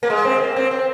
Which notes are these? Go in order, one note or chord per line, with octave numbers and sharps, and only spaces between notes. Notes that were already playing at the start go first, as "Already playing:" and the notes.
A#3
G#3
C4
A#3
C4
C4